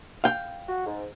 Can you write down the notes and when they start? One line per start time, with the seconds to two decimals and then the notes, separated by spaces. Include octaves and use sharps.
0.24 F5 G5
0.68 F#4
0.87 G#2